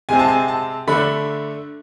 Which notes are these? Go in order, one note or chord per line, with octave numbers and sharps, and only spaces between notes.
C3 G#3 C4 G#5
A5
G#5
A5
D3 A3 D4 B5